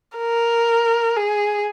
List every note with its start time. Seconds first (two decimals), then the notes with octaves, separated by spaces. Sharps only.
0.18 A#4
1.16 G#4